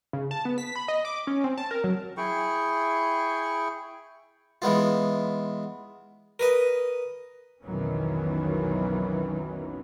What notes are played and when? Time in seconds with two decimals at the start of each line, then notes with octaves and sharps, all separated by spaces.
0.13 C#3
0.31 A5
0.45 B3
0.58 B6
0.76 B5
0.88 D#5
1.05 D6
1.27 C#4
1.44 C4
1.57 A5
1.71 A#4
1.84 F#3
2.17 E4 G#4 G5 C#6
4.62 E3 G#3 B3 F4
6.39 A#4 B4 D#5
7.64 B1 F2 D#3 E3 F#3 C#4